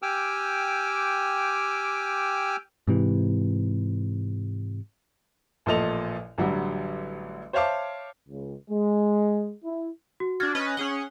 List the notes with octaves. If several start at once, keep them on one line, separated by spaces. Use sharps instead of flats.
G4 G5 G#5 D6 E6 F6
G#2 C3 E3
A1 A#2 F3 A4 D#5 F7
A1 D3 F#3 G3
C5 C#5 E5 F5 A5 D6
C#2
G#3
E4
F#4
D4 F#4 F6 G#6 A6
C#4 B4 D#5
C#4 G#4 F#5 G7